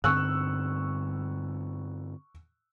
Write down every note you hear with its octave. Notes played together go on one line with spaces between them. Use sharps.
G2 D3 C4 C#6 E6 F#6